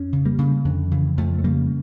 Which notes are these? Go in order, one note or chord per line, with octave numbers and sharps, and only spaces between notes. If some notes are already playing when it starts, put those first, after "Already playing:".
Already playing: F2 C#4
C#3
G3 A#3
C#3
F2 D3
C#3 E3
F2 F3 A3
A3
C#3 G3 A#3